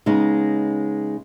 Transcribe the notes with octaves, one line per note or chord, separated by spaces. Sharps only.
C#3 G#3 B3 D#4